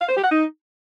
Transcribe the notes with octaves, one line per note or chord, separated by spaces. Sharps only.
F5
C5
G4
F#5
D#4